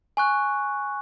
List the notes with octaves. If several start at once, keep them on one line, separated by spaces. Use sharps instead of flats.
G#5 C#6 F#6